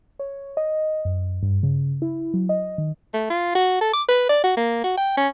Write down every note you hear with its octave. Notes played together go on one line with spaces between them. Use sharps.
C#5
D#5
F#2
G2
C#3
E4
F#3
D#5
D#3
A3
F4
F#4
A4
D6
B4
D5
F#4
A#3
F#4
G5
C#4